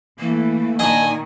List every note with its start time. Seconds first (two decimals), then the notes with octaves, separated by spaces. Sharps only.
0.20 E3 A3 A#3
0.79 A#2 D#3 D4 D#5 G#5